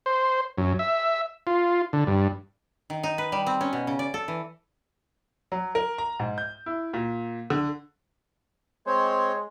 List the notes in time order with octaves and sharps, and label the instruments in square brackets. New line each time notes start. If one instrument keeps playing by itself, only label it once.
[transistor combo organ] C5
F#2
E5
F4
D3
G2
[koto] D#3
D#4
B4
G3
C4
C#4
B2
C#3
D5
A4
E3
[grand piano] F#3
A#4
A#5
G#2
G6
E4
A#2
D3
[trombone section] G#3 [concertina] C4 C5 [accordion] C#5 [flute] C6